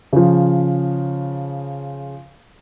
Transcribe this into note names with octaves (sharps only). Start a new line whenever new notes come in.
C#3 F3